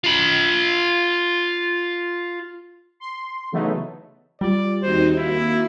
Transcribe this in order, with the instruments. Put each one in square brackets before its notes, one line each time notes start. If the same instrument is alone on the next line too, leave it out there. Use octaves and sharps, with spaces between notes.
[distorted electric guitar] F4 B5
[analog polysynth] C6
C#3 E3 F#3 A3 B3 D#4
[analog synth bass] G3 [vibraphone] F4 [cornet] D5
[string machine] D#2 C4 D#4 [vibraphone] F#4 [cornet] C5
[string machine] A#3 [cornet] E4